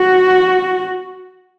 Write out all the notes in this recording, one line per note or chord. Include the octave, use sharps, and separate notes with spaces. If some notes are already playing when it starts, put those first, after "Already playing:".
Already playing: F#4